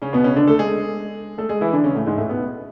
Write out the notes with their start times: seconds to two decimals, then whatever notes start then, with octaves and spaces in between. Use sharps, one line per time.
0.02 C#3 C#4
0.13 B2 B3
0.24 C#3 C#4
0.36 D3 D4
0.48 A3 A4
0.59 G#3 G#4
1.38 A3 A4
1.49 G#3 G#4
1.61 E3 E4
1.72 D3 D4
1.84 C#3 C#4
1.95 A2 A3
2.06 G#2 G#3
2.18 A2 A3
2.29 B2 B3